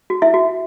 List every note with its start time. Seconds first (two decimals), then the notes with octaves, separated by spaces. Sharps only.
0.10 F#4
0.22 E4 E5
0.34 F#4